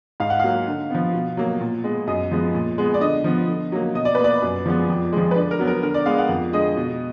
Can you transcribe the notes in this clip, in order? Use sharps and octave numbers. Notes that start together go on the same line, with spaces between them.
G#2 F5
F#5
F#3 A#3 F5
D3
F3 B3
B2
F#3 A#3
A#2
G#3 B3
F#2 D#5
F3 G#3 B3
A#2
G#3 B3
D5
D3 D#5
F3 B3
D3
F#3 A#3
B2 D#5
D5
A#3 B4
D5
F#2
F3 G#3 B3
F2
F3 G#3
B4
D3 D5
A#4
F#3 B3
A#4
D3 A#4
D5
G#3 B3 F5
F#5
F2
D3 G#3 D#5
B2